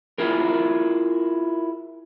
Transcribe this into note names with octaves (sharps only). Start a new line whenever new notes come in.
E4 F4 G#4 A#4